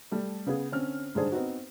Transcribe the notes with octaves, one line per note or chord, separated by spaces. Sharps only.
G3 A3
C#3 B3 G#4
D3 C4 C#4 F6
G#2 D3 G3 D4 G#4 C5
B3 C4 D#4 F#4